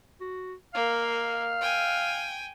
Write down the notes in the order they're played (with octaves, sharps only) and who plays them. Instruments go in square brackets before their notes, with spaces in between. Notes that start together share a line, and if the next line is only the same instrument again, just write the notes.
[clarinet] F#4
[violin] A#3 [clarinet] F5
[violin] G5 G#5